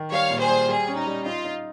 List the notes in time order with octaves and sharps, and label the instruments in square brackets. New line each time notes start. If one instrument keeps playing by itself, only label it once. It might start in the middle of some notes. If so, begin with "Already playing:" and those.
Already playing: [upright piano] D#3
[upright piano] G3 [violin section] C#5 F5
[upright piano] A#2
[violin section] G#4 C5
[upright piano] G3
[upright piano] G3 [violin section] G#4
[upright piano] C#4
[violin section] D#4
[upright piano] G3
[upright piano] D#4 [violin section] F4
[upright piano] D#4